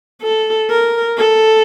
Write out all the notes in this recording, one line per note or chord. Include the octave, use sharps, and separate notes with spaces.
A4
A#4
A4